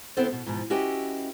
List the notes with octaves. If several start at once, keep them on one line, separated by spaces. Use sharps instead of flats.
D3 B3 C4 E4 A4 C5
B2
G#2 B2 E3 F3
C#4 E4 F#4 G4 B4 D#5